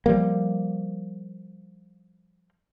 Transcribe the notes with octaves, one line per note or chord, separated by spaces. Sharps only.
F3 G3 A#3